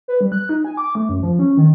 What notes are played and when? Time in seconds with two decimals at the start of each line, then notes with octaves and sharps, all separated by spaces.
0.08 B4
0.21 G3
0.32 F#6
0.49 D#4
0.65 G#5
0.77 D6
0.95 A3
1.09 F#2
1.23 F3
1.39 C#4
1.57 D#3